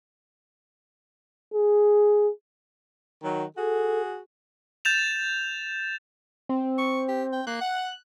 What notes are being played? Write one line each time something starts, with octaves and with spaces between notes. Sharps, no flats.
G#4
D#3 F#3
F#4 G#4 A4
G6 A6 E7 F7
C4
C#6
G4
G5
A#3 F#6
F#5